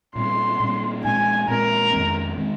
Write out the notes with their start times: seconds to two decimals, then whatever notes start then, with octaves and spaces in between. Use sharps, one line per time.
0.16 A#2 G3 C4 C6
0.60 A#2 G3 C4
1.04 A#2 G#3 C4 G#5
1.48 A#2 G#3 C4 A#4
1.92 F2 D#3 G#3 C4
2.38 D#3 G#3 C4